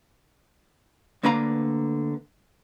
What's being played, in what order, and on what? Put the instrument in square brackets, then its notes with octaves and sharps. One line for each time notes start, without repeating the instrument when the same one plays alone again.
[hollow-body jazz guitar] D2 D3 A#3 B4 F5 A#5